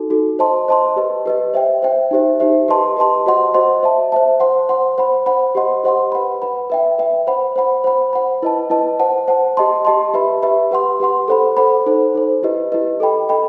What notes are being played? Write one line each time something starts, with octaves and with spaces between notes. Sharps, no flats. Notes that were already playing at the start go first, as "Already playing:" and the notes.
Already playing: D#4 F#4 A4
D#4 F#4 A4
C5 D#5 A5 C6
C5 D#5 A5 C6
G4 B4 D#5
G4 B4 D#5
C5 E5 G5
C5 E5 G5
D#4 G4 C5 E5
D#4 G4 C5 E5
G4 B4 D#5 A5 C6
G4 B4 D#5 A5 C6
F#4 C5 D#5 F#5 C6
F#4 C5 D#5 F#5 C6
C5 E5 A5
C5 E5 A5
C5 F#5 C6
C5 F#5 C6
C5 F#5 B5
C5 F#5 B5
G4 C5 D#5 F#5 C6
G4 C5 D#5 F#5 C6
B4 F#5 B5
B4 F#5 B5
B4 E5 G5
B4 E5 G5
C5 F#5 B5
C5 F#5 B5
C5 F#5 B5
C5 F#5 B5
E4 B4 D#5 A5
E4 B4 D#5 A5
C5 F#5 A5
C5 F#5 A5
G4 D#5 A5 C6
G4 D#5 A5 C6
G4 B4 E5 B5
G4 B4 E5 B5
G4 B4 F#5 C6
G4 B4 F#5 C6
A4 C5 F#5 B5
A4 C5 F#5 B5
D#4 A4 C5
D#4 A4 C5
E4 G4 B4 D#5
E4 G4 B4 D#5
A4 D#5 G5 B5
A4 D#5 G5 B5